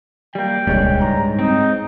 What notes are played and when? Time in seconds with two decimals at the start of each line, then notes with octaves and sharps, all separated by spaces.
0.35 G3 A#3 G5
0.67 D#1 C#2 G2 G3 G#3 C#5
1.01 G#2 A#5
1.39 C4 D#4